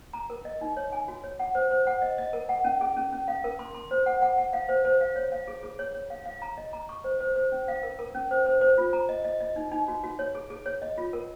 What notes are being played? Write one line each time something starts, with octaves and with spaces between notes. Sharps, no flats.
A#5
A#4
D#5
D#4
C#5
G#5
F#4
C#5
F#5
C5
C5
F#5
D#5
D#5
A#4
F#5
C#4
G#4
C#4
C#4
F5
A#4
C6
C6
C5
F#5
F#5
F#5
F5
C5
C5
F5
C#5
F5
G#4
G#4
C#5
C#5
F5
F5
A#5
D#5
A#5
C#6
C5
C5
C5
C#4
F5
A#4
A#4
C#4
C5
C5
C5
F4
A#5
D#5
D#5
D#5
D#4
D#4
F#4
F#4
C#5
G#4
G#4
C#5
D#5
F4
A#4